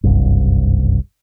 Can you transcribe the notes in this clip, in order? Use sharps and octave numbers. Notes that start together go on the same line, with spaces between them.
F#1 C2 G2